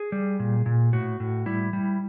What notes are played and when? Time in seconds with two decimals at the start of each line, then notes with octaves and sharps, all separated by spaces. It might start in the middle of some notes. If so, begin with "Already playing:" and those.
Already playing: G#4
0.12 G3
0.40 A#2
0.66 A#2
0.93 A2 F#4
1.20 A2
1.46 G3 E4
1.73 G3